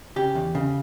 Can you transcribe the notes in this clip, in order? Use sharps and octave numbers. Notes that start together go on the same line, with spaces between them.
C#3 G4
E2
C#3